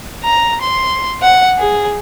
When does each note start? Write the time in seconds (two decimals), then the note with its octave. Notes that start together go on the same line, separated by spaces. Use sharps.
0.24 A#5
0.62 C6
1.22 F#5
1.59 G#4